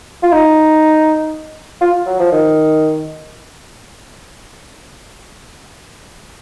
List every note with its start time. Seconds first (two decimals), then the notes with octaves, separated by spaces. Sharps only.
0.23 F4
0.32 D#4
1.81 F4
2.06 F#3
2.20 F3
2.32 D#3